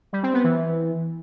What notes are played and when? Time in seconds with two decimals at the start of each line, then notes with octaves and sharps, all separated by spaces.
0.13 G3
0.23 C4
0.34 B3
0.44 E3